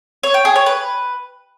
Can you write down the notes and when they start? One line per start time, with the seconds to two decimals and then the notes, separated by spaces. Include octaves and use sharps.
0.23 C#5
0.34 G5
0.45 G#4
0.56 C#5
0.66 B4